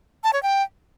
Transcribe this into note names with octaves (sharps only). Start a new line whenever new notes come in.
A5
C#5
G5